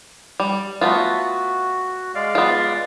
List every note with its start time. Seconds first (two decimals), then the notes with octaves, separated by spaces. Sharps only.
0.40 G3
0.81 A3 B3 F4 F#4
2.15 G#3 D5 F5
2.35 B3 F4